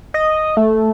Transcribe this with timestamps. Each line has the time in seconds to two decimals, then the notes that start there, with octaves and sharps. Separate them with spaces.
0.14 D#5
0.57 A3